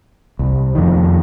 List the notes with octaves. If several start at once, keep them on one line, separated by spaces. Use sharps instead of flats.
C2
F2 D#3